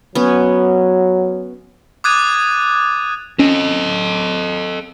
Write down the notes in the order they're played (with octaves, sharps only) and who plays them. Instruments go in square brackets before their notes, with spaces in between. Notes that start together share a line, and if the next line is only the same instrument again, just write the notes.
[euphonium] F#3 [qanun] B3 C#4
[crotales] D6 D#6 F#6 G#6 A6 D#7
[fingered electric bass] C#4 [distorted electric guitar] A4 D#5